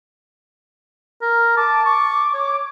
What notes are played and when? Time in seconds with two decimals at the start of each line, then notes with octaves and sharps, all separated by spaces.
1.22 A#4
1.57 A5 D6
1.86 C#6
2.34 C#5